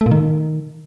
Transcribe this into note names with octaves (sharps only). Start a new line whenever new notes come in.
A3
A#2
D#3